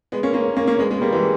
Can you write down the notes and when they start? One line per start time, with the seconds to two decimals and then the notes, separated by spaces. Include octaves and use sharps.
0.12 G#3 B3
0.23 A#3 C#4
0.34 A#3 C#4
0.56 A#3 C#4
0.67 A#3 C#4
0.79 G#3 B3
0.91 G#3 B3
1.01 G3 A#3
1.12 E3 G#3